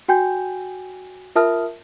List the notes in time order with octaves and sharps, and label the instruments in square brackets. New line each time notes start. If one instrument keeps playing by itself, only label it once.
[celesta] F#4 G5 G#5 G6
F4 A#4 E5 A5 D#6 F6